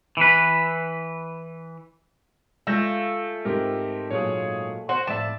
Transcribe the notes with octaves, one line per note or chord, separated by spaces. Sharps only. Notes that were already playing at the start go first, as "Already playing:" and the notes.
E3 B4
G#3 A3 F4 F5 E6 G6 A#6
G#2 C4 G4 A#4
A#2 F#3 A#3 G#4 C#5
F#4 C5 C6
F2 A2 D5 E5 A5